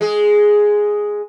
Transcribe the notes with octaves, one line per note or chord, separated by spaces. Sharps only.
G#3 G#4